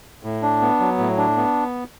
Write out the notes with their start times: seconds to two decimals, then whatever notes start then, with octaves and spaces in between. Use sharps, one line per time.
0.23 A2
0.42 D4
0.61 B3
0.80 F#3
0.98 A2
1.17 D4
1.37 B3